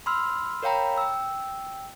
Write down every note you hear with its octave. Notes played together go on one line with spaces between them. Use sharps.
B5 C6 E6 F6
A#4 C#5 F5 G5 A#5 B5
G5 E6